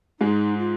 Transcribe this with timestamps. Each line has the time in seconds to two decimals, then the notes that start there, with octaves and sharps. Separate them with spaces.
0.20 G#2 G#3 D#4
0.58 F4